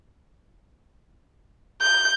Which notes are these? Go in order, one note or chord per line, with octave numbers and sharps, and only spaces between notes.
G6